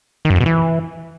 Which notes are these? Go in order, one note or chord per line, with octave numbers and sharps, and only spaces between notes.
D#3
F#2
F2
B2
E3